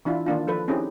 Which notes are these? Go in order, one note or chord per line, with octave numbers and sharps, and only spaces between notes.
E3 D4 E4 F4
D#3 A#3 D4 F4
F3 A4 B4
C4 C#4 D#4 E4 G4 G#4